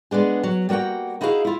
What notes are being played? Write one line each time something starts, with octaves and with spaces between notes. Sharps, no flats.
G#3 B3 D4 G#4
F#3
G3 A#3 F#4 F#5 G5
D#4 E4 F#4 G#4 B4 F5
E4 F4